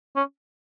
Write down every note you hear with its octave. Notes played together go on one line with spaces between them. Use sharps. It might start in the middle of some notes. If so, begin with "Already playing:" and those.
C#4